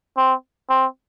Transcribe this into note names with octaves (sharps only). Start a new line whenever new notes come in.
C4
C4